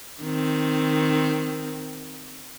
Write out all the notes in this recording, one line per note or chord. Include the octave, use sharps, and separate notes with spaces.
D#3 C4